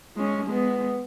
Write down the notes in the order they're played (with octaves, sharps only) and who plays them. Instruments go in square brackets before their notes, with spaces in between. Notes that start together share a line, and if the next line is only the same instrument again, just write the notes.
[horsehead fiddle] G#3 C#4
G#3 B3